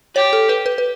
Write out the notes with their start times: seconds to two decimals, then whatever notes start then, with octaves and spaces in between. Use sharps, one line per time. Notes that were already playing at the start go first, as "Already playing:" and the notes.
0.16 G4 C#5
0.33 A4
0.49 B4
0.66 B4
0.78 B4